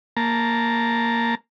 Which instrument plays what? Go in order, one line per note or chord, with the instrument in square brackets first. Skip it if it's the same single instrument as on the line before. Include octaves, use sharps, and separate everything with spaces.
[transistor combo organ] A#3 A5 A#5